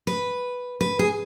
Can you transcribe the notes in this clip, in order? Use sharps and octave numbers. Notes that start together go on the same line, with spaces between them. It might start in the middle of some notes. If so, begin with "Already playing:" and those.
B4
B4
G#4